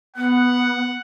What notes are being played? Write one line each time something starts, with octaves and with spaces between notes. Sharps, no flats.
B3 F#5